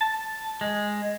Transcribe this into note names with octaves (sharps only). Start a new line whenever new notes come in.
A5
G#3